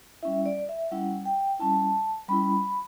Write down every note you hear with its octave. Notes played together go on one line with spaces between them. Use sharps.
G3 C#4 E4 E5
D5
E5
G3 C#4 E4 F#5
G5
G3 C#4 E4 A5
G3 C#4 E4 B5